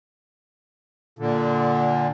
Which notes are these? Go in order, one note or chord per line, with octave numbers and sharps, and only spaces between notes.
A#2 D3